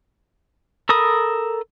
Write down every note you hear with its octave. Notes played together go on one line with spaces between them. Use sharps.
A4 A#4 B5 D#6